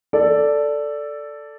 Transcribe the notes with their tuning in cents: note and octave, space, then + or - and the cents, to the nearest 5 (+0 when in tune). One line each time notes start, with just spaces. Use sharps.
A4 +5 D5 -5